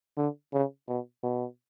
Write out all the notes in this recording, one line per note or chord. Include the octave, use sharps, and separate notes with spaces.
D3
C#3
B2
B2